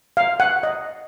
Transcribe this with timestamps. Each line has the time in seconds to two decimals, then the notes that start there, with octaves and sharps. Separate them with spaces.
0.17 F5
0.40 F#5
0.63 D#5